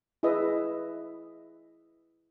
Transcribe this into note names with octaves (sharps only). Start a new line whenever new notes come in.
E4 G#4 B4 D#5 E5